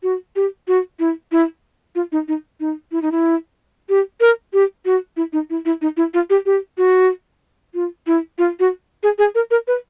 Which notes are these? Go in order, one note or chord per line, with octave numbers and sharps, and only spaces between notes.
F#4
G4
F#4
E4
E4
F4
D#4
D#4
D#4
E4
D#4
E4
G4
A#4
G4
F#4
E4
D#4
E4
E4
D#4
E4
F4
G4
G4
F#4
F4
E4
F4
F#4
G#4
G#4
A#4
A#4
B4